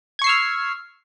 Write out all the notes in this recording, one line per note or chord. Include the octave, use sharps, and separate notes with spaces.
C#6 E6 F6 G#6 C7